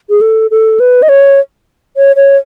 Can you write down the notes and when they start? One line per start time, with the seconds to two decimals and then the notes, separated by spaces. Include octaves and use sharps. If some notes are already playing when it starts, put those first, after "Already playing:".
0.10 G#4
0.21 A4
0.51 A4
0.80 B4
1.02 D#5
1.09 C#5
1.97 C#5
2.16 C#5